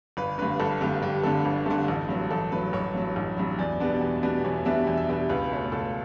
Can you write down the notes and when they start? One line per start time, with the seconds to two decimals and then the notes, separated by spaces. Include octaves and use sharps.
0.17 G1 B4
0.38 G2 D3 B4
0.60 G1 A4
0.81 G2 D3 G4
1.02 G1 G4
1.23 G2 D3 A4
1.45 G1
1.66 G2 D3 A4
1.88 A1
2.09 G2 F#3
2.31 A1 A4
2.52 G2 F#3 B4
2.73 A1 C#5
2.95 G2 F#3
3.16 A1
3.37 G2 F#3
3.59 E2 D5
3.80 B2 G3 B3 D4
4.01 E2
4.23 B2 G3 B3 D4
4.44 E2 C#5
4.65 B2 G3 B3 D4 E5
4.87 E2 E5
4.98 E5
5.08 B2 G3 B3 D4 E5
5.29 C#2 B4
5.51 B2 A3 C#4
5.72 C#2 A4